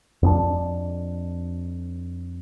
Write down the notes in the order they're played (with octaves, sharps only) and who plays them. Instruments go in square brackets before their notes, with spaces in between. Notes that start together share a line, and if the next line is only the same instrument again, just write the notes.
[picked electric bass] F2 B3 D4